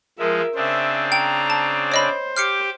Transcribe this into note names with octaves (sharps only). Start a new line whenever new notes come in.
F3 G#3 A#4 E5
C#3 C4 D4 C5 E5
G5 A#5
A5
C5 C#5 D#5 B5
G4 D6 F6 C7 C#7